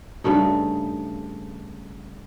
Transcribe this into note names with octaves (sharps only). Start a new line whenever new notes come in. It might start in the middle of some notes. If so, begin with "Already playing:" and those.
G2 C#3 A3 D#4